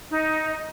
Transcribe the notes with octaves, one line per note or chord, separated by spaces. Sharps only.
D#4